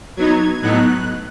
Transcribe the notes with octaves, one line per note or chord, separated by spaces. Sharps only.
F#3 B3 D#4 G#6
A2 F#3 B3 D#4 F#6